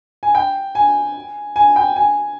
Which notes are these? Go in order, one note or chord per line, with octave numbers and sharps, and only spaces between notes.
G#5
G5
G#5
G#5
G5
G#5